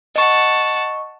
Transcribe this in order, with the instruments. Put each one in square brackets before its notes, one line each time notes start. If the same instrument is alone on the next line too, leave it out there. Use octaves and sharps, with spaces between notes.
[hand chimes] D#5 C#6 [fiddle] F#5 A5